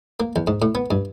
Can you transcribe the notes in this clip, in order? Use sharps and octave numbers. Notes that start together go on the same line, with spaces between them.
A#3
E2
G#2
A2
B3
G2